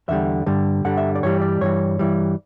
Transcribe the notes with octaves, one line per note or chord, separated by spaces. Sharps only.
E2 D3 G3 E5
G2 D3 G3
G2 D3 G3 F#5
E5
D5
G2 E3 G3 C#5
D5
G2 E3 G3 C#5
G2 E3 G3